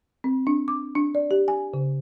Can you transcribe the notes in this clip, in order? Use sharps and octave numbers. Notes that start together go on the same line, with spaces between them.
C4
D4
D6
D4
D5
G4
G#5
C#3